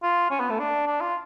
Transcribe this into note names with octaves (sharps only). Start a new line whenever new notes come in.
F4
C#4
B3
A3
D4
D4
F4